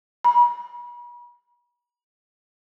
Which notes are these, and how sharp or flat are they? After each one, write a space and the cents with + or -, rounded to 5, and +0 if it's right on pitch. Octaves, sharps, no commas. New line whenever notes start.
B5 -40